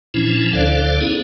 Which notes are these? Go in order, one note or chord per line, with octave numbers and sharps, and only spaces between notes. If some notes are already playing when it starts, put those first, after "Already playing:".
A#2 E3 F3 C#4 D4 E4
D2 D3 A4 C5 D5 F5
B3 C#4 D#4 E4 G#4